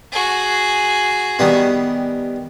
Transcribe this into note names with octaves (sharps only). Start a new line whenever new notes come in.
F#4 G#4
D#3 G3 B3